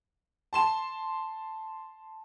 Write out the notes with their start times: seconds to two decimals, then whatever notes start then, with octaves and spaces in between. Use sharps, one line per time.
0.53 A5 C6 E7